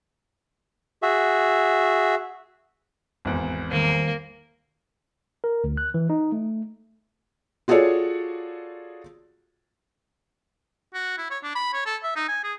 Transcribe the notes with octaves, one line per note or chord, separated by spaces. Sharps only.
F#4 G#4 E5
G#1 E2
D#3 G3 A#3 C5
A#4
D2
F#6
E3
D#4
A3
F4 F#4 G#4 A4 C#5 D5
F#4
E4
C#5
D4
B5
C#5
A4
E5
D#4
G#5
G#4